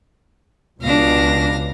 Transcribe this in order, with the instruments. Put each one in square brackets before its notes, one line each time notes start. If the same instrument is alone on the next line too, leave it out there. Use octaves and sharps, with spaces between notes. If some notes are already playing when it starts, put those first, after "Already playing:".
[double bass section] C#2 [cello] B2 D4 [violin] F5 A#6